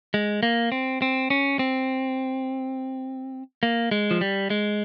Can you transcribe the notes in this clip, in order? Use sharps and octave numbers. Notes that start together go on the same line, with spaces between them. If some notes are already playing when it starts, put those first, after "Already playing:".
G#3
A#3
C4
C4
C#4
C4
A#3
G#3
F3
G3
G#3